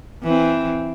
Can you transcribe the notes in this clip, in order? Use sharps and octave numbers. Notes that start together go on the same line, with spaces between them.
E3 C4